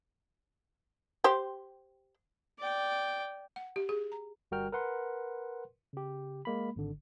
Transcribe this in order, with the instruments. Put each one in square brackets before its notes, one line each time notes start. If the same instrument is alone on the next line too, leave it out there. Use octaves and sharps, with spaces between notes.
[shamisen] G4 C5
[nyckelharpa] D5 G5
[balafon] F#5
G4
G#4
A#5
[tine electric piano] G1 G3 F#4 A#4 G5 F6
A#4 B4 F#5 C6
C#3 G4
G#3 A#3 B5
G#1 D3